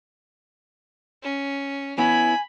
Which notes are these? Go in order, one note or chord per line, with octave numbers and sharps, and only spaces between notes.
C#4
B3 C#4 E4 G#5 B5